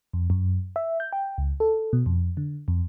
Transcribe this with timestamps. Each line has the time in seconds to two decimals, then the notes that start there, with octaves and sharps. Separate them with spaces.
0.13 F2
0.30 F#2
0.76 E5
1.00 G6
1.13 G5
1.38 C#2
1.60 A4
1.93 B2
2.06 F2
2.37 D3
2.68 F2